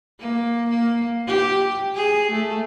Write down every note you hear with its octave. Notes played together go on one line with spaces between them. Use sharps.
A#3
A#3
G4
G#4
A3